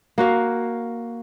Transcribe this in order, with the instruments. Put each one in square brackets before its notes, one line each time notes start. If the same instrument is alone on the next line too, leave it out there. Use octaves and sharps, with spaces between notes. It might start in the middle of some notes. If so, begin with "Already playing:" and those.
[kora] A#3 F#4 F5